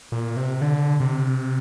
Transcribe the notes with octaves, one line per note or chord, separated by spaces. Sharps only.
A#2
C3
D3
C3